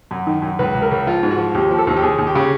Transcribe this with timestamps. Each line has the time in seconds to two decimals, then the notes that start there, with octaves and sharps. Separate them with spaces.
0.11 F#2
0.27 D#3
0.42 F#2
0.59 C#2 B4
0.74 C#2
0.82 A#4
0.91 C#2
1.07 F3 F4
1.23 G#2
1.31 F#4
1.38 F3
1.54 D#2 G4
1.71 F3
1.78 A4
1.87 D#2
1.97 G4
2.02 D#2 G#4
2.18 D#2
2.27 G4
2.35 C#3